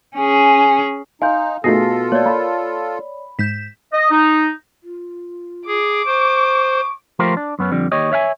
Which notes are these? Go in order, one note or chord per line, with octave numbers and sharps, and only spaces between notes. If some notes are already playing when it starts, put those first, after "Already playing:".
C#4 G#4
D#4 F5 G#5 C6 G6
B2 A3 D#4 F4 G#4 A4 A#6 C7
A3 A#3 C#5 D5
A#3 B5
G#2 G6 B6 E7
D#5
D#4
F4
G#4 D6
C5 C#6
F3 A3 F4 G4 A#4 C5
D4
F#2 B3 C#4
F2 D3 G3
D#2 G4 C#5 D#5
C#5 E5 F5 G#5